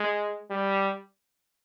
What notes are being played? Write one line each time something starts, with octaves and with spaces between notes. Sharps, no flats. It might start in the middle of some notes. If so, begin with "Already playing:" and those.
Already playing: G#3
G3